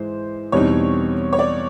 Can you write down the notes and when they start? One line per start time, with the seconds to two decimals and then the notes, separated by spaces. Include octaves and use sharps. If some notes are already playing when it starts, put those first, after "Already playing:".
Already playing: G#2 E3 G#3 C5
0.52 E2 B2 G3 C4 D#4 C#5
1.33 C#5
1.39 D5